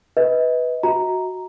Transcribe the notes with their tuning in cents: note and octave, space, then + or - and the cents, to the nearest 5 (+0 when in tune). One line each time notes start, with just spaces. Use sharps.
B4 +0 D#5 +35
F#4 +0 D#5 +45 A#5 +0